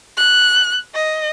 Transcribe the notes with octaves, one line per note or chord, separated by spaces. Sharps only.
F#6
D#5